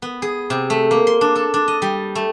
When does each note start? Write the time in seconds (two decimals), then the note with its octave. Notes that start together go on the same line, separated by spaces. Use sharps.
0.02 B3
0.22 G#4
0.50 C3
0.70 A3
0.91 A#3
1.07 C6
1.21 D4
1.35 A4
1.54 D4
1.68 D#5
1.82 G3
2.15 A3